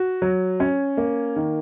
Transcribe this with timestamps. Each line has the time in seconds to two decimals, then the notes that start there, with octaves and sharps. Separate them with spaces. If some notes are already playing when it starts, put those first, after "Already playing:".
Already playing: F#4
0.22 F#3
0.60 C#4
0.97 A#3
1.36 D#3